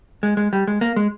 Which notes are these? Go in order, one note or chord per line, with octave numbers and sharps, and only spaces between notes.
G#3
G#3
G3
G#3
A#3
G#3